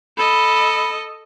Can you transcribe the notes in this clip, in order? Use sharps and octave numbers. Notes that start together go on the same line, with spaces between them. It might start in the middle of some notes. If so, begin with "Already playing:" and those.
A4 D#5 B5